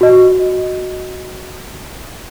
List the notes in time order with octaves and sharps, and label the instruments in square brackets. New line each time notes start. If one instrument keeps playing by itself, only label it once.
[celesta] F#4 D#5